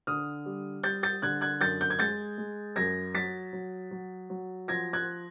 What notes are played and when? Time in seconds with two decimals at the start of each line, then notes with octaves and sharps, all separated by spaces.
0.07 D3 D#6 F6
0.46 G3
0.83 G3 G6 A6
1.03 G6 A6
1.22 D3 F#6 G#6
1.41 F#6 G#6
1.61 F#2 G6 A6
1.81 G6
1.90 G#6
1.99 G#3 G6 A6
2.38 G#3
2.76 F#2 G#6 A#6
3.14 F#3 A6 B6
3.53 F#3
3.91 F#3
4.30 F#3
4.68 F3 G#6 A#6
4.93 F#6 G#6